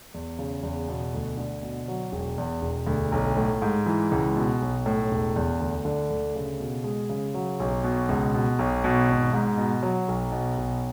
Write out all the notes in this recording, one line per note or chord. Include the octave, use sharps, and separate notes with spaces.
E2
C#3
E2
B2
D2
D3
B2
F#3
E1
E2
E1
D2
B1
A2
G#2
E3
C#2
B2
B1
A2
E1
E2
D2
D3
D2
C#3
B2
G#3
C#3
F#3
B1
B2
C#2
B2
B1
B2
G#1
G#2
B2
F#3
B1
B2
B1